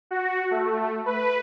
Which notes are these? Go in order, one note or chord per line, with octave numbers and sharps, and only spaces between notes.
F#4
A3
B4